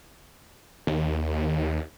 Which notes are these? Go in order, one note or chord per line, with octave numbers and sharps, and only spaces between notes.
D#2